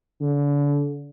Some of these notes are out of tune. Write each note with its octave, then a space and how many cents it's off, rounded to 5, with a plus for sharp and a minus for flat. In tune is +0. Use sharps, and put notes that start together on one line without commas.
D3 -35